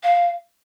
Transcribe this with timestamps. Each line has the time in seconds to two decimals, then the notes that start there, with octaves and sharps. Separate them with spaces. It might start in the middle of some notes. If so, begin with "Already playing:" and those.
0.02 F5